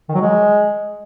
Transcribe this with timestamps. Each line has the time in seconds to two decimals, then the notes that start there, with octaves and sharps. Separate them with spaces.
0.09 D#3
0.15 F#3
0.21 G#3